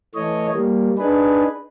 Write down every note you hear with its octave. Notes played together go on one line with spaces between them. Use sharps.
E3 A3 C#5 D#5
G3 A#3
D4 D#4 G#4 B4